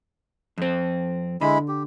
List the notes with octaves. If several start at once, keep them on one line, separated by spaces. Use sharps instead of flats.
F2 C4
D3 G#3 E4 B5
G4